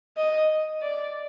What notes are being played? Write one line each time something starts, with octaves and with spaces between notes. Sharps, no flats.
D#5
D5